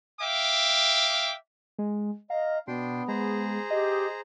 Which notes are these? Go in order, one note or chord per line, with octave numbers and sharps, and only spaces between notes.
E5 F5 G5 D6
G#3
D#5 F5 A#5
B2 B3 D4 G5 C6
G#3 G#4 C5 A#5
G4 D#5